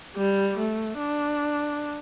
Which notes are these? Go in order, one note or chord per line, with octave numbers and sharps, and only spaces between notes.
G3
A3
D4